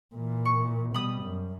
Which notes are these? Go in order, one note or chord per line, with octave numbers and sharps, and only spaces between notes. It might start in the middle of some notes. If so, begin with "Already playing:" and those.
A#2 E3
C#6
B2 G3 B5 D#6
F#2